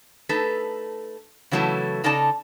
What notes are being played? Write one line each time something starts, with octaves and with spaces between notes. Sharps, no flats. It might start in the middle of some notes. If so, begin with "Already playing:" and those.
A3 D#4 A4 B4
C#3 E3 F#3 A3 E4 A4
C#3 D#4 A4 D5 A5